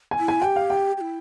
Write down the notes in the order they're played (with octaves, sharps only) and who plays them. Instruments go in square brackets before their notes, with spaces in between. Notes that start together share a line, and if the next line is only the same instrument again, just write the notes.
[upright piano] G#5
[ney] E4
[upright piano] G#5
[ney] G4 [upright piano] G5
[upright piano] F5
G5
[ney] G4
E4